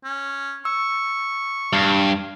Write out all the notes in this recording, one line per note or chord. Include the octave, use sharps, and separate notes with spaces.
C#4
C#6 E6
G2 F6 C7